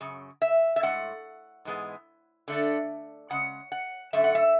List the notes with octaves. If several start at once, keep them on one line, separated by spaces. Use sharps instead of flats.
F#2 C#3
E5
E5
A2 G#3 C#4 F#5
G#2 E3 G#3 B3
D3 A3 D4
C#3 G#3 C#4 F#5
F#5
F#2 D3 A3 E5
F#5
E5